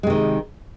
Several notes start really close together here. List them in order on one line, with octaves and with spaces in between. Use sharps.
G#3 C3 D#3